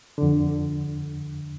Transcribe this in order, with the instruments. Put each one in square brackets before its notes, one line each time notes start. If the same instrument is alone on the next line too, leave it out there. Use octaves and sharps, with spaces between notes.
[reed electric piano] F2 D3